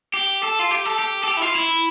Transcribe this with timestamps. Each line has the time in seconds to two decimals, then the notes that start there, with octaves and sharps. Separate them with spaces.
0.14 G4
0.43 A4
0.59 F4
0.71 G4
0.86 A4
0.99 G4
1.24 A4
1.28 G4
1.37 E4
1.42 F4
1.55 E4